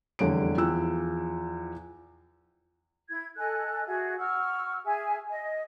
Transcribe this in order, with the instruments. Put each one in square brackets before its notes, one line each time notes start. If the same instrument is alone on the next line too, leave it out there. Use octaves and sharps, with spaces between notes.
[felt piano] F1 E2 D3 G3 C#5 D7
E2 F3 G5 E6 F#6
[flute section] E4 G#6
A4 D#5 G#5 F#6
F#4 G#4 E5 F#5
F#5 C#6 E6 F6
G#4 E5 G#5
D#5